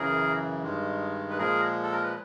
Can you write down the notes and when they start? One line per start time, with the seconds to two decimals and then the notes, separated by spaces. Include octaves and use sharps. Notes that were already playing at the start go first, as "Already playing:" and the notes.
Already playing: F#2 C#3 E3 G#4 A#4
0.63 G2 D#3 G#3
1.30 B4
1.38 A#2 F3 G#3 G#4 A#4
1.83 A4
1.92 A#4
2.03 B4